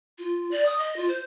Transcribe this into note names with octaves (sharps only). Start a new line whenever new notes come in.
F4
D5
D#6
D#5
F4
C5